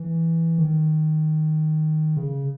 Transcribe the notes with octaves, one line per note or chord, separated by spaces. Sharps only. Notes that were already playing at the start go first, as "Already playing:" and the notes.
Already playing: E3
D#3
C#3